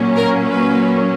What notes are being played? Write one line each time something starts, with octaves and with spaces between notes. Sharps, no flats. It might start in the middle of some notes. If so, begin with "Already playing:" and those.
Already playing: A#2 F#3 A#3 C#4
A#4
B4